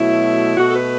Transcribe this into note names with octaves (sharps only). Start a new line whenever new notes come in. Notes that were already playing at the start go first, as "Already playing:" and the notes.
Already playing: B2 F#3 A3 E4
B2 A3 F#4
A4
B4